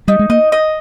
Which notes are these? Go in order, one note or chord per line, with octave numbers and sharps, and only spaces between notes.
G3 D#4
G#3
A#3 D#5
D#5